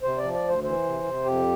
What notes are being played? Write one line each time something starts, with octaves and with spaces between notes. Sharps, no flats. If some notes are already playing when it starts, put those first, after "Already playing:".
C3 C5
D5
F3
D5
D2
C5
E3 C5
C3
C3
F2 G4